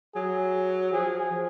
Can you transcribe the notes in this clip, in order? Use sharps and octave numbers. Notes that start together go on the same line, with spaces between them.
F#3 G#4
F3 G#4
F3